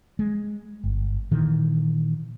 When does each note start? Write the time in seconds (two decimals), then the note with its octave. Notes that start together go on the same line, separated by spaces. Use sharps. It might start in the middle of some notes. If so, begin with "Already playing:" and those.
0.19 G#3
0.84 G1
1.31 A#2 D#3 E3